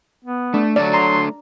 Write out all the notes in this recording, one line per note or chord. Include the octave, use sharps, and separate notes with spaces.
B3
A3 D4
F#3 A3 D4 A4 D5
A#5 C6